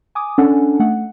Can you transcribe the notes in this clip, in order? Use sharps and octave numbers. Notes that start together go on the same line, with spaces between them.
G#5 D6 D#6
C#4 D4 A4 F#5 G#5
A3 F#5